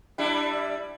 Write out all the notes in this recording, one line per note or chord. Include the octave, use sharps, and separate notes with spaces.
G3 D4 E4